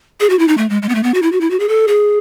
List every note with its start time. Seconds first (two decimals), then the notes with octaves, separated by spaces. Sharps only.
0.20 G#4
0.30 F#4
0.39 E4
0.48 D#4
0.58 A3
0.70 G#3
0.82 G#3
0.89 B3
0.95 A3
1.03 B3
1.14 F#4
1.22 E4
1.32 F#4
1.41 E4
1.50 F#4
1.60 G#4
1.69 A4
1.88 G#4